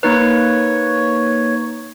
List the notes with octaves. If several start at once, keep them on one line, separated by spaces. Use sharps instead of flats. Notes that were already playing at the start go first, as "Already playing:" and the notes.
A#3 D#4 B4 C#5